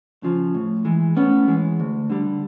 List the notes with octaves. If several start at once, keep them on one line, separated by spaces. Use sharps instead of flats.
C#3 F3
A2
E3 G#3
A2 B3 C#4
E3 G#3
D2
D3 G3